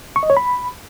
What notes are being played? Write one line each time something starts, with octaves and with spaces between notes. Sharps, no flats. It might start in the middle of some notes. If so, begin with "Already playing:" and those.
C#6
D#5
C#5
B5